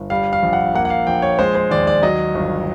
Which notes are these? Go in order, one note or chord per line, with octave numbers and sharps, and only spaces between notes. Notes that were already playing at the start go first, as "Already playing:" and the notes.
Already playing: G1
G3 F5
F5
A#1
F#5
A#3 F#5
F#5
F5
A#1 G5
C#5
G#3 C5
C5
D#2 D5
D5
F#3 D#5
G1